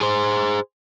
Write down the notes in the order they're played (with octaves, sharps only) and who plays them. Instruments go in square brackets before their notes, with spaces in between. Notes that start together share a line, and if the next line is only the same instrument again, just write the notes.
[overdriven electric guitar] G#4 C5